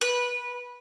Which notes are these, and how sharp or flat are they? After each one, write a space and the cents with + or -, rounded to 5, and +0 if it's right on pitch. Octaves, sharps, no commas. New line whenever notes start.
B4 -15